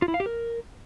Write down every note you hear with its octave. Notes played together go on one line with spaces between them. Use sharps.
F4
E4
F5
G4
A#4